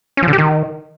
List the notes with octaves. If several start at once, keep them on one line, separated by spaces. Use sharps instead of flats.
C#4
F3
D3
G4
D#3